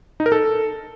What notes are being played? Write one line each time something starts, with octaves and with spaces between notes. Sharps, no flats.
D#4
A#4
A4